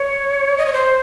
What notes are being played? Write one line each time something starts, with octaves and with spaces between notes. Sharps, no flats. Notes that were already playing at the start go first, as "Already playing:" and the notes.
Already playing: C#5
D#5
C#5
C5